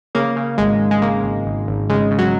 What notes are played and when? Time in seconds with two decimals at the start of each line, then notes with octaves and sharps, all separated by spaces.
0.15 C#3 A#3
0.36 C#3
0.58 G#1 G#3
0.80 G#1
0.91 G#3
1.02 C#3 A#3
1.24 G#1
1.45 G#1
1.68 G#1
1.90 C#3 G#3
2.11 C#3
2.19 F#3